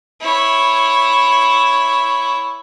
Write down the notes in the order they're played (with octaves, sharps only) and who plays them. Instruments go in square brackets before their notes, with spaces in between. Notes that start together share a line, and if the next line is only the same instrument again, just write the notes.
[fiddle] E4 C#5